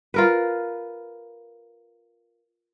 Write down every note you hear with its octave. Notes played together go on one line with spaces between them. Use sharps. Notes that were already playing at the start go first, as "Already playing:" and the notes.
F4 A#4 B4